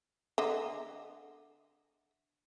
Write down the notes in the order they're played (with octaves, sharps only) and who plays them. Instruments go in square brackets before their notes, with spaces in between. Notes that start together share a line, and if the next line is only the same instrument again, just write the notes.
[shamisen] D3 D#5 E5